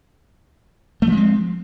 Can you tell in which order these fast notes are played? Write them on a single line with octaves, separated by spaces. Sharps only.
A3 F3 G#3 C4